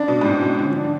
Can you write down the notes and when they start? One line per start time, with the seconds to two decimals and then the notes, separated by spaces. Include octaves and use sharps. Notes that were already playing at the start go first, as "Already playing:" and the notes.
Already playing: C#3 D4
0.08 B2
0.21 G#2
0.25 A2
0.41 B2
0.59 D3 C#4
0.71 F3 D4
0.84 D3